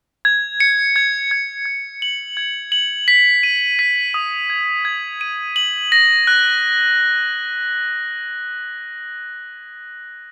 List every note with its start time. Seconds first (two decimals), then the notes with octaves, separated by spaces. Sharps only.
0.25 G#6
0.60 C#7
0.96 G#6
1.31 G#6
1.66 G#6
2.02 F#7
2.37 G#6
2.72 F#7
3.08 B6
3.43 D#7
3.79 B6
4.14 D#6
4.50 G#6
4.85 G#6
5.21 D#7
5.56 F#7
5.92 A#6
6.27 F#6